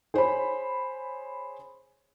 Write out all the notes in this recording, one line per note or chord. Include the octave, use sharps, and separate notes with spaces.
G#4 C5 C#5 B5